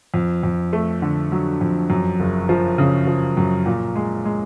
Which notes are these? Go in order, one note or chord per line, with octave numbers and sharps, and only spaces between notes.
F2
F2
A3
D3
F#3
F2
F#2
F#1
F3
C#3
F3
F#2
A#2
G#3
G#3